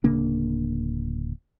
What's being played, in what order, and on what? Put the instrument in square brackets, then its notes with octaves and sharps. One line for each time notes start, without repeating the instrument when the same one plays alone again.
[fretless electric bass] D1 C#3 A#3 D4